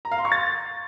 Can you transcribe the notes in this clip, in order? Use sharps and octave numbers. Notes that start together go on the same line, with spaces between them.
A#5
F5
C6
C#6
A6